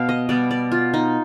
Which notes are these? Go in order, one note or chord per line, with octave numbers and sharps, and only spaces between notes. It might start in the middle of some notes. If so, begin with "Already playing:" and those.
Already playing: B2 B3 F5
D#5
B2 G3 B3 D5
D5
F4
D#4